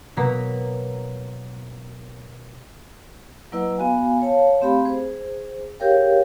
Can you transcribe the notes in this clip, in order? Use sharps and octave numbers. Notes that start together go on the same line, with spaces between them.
B2 F#3 A#3 A#5 B6
F#3 A#3 E4 B4 D#5 F#5
B3 F#4 F5 G#5
C#5 F5 A5
A3 C4 G4 F5 B5
G#4 C5
G4 G#4 A#4 C#5 F5 G5